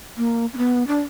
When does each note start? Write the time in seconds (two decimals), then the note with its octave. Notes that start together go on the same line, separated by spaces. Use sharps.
0.17 A#3
0.53 C#4
0.57 B3
0.87 D4